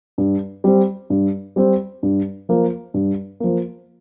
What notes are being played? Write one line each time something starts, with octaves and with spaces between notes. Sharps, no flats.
G2
G3 C4
G2
G3 C4
G2
F3 A#3
G2
F3 A#3